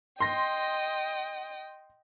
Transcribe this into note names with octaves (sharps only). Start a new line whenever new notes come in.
D#5 G5 C6 A#6